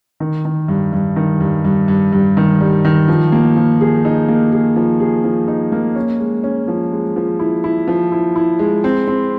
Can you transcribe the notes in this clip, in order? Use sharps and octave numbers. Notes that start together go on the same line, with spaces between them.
D#3
D#3
G2
G2
D#3
G2
G2
G2
G2
D#3
G3
D#3
F3
A#3
F3
G#4
D#4
A#3
G#4
F3
G#4
F3
D#4
A#3
C#4
G#3
C#4
F3
G#3
F3
E4
E4
F3
E4
E4
G#3
C4
C4